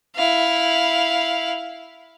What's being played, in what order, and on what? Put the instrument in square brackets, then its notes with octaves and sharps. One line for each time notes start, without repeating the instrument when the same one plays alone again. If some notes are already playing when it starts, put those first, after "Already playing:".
[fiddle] E4 F5